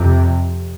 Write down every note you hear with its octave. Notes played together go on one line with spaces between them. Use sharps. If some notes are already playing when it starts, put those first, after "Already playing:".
Already playing: F2 C3